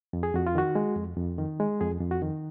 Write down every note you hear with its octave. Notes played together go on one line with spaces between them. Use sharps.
F2
G#4
F2 F#4
F4
D#3 F#4
G#3
F2
F2
D#3
G#3
F2 G#4
F2
F#4
D#3